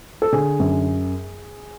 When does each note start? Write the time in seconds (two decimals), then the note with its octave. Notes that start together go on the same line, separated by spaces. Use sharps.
0.22 A4
0.32 D3 G#4
0.60 F#2